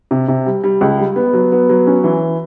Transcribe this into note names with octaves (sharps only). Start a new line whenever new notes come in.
C3
C3
G3
G3
C#2
G3
B3
F#3
B3
F#3
C#4
E3